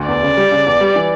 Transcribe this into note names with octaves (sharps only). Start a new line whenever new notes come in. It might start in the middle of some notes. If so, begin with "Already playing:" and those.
Already playing: D2
E2 D5
C#3
G3
C#3
E2
G3
E3